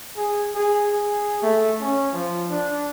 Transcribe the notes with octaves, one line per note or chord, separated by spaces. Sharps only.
G#4
G#4
G#4
A3
C#4
F3
D4